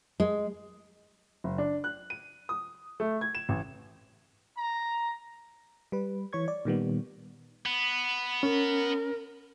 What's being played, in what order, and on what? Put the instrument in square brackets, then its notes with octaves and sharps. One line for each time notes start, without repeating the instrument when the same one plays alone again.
[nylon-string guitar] G#3
[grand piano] F#1
D4
F#6
D#7
D#6
A3
G#6
E7
A1
[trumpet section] A#5
[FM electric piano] G3 B4
E3 C#5 C#6 G#6
D5
A#2 D#3 G3 B3
[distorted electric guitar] B3
[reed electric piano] C#4 [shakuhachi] A#4